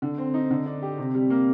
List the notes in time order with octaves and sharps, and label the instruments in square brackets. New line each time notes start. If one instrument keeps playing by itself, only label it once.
[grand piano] D3
C4
D#4
D3
D4
G4
C3
G3
A#3